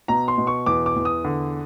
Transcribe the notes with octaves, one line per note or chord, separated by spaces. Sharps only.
B2 A#5
C6
B2
C#6
E2 D6
D6
E2
D#6
D3